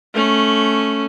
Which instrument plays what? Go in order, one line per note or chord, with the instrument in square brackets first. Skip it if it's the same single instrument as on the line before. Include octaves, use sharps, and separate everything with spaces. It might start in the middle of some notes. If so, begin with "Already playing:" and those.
[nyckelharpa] A3 C#4